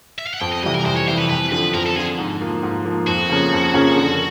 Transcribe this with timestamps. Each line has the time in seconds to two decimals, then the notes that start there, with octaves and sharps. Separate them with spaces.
0.18 E5
0.26 F5
0.34 F#5
0.41 F2 G5
0.52 D#5
0.63 C3 E3 G3 D#5
0.74 A#4
0.85 F2 C5
0.96 C#5
1.08 C3 E3 G3 C5
1.19 B4
1.30 F2 B4
1.52 D3 F3 B4
1.74 F2 A#4
1.86 A4
1.96 D3 F3 G#4
2.18 G#2
2.41 F3 A#3
2.63 G#2
2.85 F3 A#3
3.07 F2 F#4
3.29 C#3 F3 A#3 C#4
3.52 F2
3.74 C#3 F3 A#3 C#4
3.97 D3